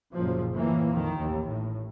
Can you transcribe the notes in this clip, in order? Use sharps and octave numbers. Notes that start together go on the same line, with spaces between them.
F#1 B1 A#2 F3
A2 E3 A#3
A#1 F2 D#3
A1 D#2
A2